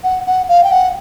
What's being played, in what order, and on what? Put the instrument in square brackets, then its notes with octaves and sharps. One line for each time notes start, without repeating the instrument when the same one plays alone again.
[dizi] F#5
F#5
F5
G5
F#5